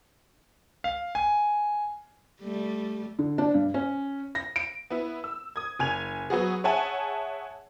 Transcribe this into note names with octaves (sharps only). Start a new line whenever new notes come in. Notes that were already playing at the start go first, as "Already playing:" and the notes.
F5
G#5
G3 A3
D3
D4
G2
C#4
A#6
D7
B3 E4
E6
D#6 G#6
F#1 G#5 G#6 F7
F#3 B3 F#4 G#4
G#4 C#5 E5 F#5 G#5 A5